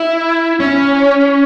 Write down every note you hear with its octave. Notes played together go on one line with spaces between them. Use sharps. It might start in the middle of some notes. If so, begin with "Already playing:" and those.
Already playing: E4
C#4